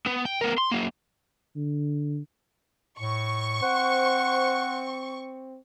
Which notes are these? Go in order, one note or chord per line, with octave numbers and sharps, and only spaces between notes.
B3
G5
B3 A#4
C6
F#3 A#3
D3
A2 C#6
C4 C5 F#5